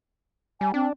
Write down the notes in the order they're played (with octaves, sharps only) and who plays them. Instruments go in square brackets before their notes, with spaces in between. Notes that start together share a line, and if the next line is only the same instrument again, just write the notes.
[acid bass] G3 [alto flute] G#5
[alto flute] C4 [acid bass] D4